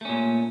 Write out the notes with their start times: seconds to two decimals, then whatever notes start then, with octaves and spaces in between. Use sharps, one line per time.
0.01 A3
0.05 C#4
0.09 A#2